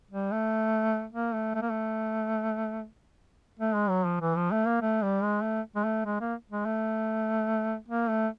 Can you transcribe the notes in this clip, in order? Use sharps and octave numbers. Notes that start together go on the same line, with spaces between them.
G3
A3
A#3
A3
A3
A#3
A3
A3
G#3
F#3
F3
E3
F3
A3
A#3
A3
G3
G#3
A3
G#3
A3
G#3
A#3
G#3
A3
A#3
A3